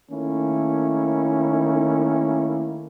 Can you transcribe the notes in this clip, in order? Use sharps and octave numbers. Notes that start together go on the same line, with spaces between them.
D#3 A3 A#3 C#4 E4